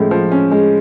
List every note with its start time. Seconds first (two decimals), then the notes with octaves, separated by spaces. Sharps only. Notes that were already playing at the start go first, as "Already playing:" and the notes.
Already playing: A2 F3 G#3 C#4
0.11 F3
0.32 C#4
0.51 G#3